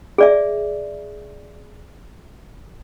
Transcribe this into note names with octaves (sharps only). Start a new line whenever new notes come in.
G#4 D5 E5